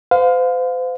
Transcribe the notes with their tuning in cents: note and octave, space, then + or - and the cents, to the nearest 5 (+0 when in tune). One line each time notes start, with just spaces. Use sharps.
C5 -40 F5 +20